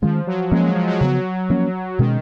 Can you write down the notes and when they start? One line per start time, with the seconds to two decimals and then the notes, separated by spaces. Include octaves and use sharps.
0.02 D#3 F3 G#3 C#4
0.27 F#3
0.52 F3 G#3 A#3 C#4
0.64 F#3
0.75 F3
0.88 F#3
1.00 C#3 F3 F#3 B3
1.50 F3 A#3 C#4
1.99 B2 D#3 G#3 C#4